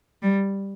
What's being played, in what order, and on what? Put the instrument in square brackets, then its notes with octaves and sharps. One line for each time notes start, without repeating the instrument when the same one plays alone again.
[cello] G3